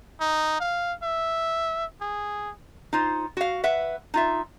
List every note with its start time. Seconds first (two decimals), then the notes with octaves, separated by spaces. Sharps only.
0.21 D#4
0.60 F5
1.03 E5
2.01 G#4
2.93 D#4 F4 C5
3.37 F#4 F5
3.64 B4 E5 F#5
4.14 D#4 F4 E5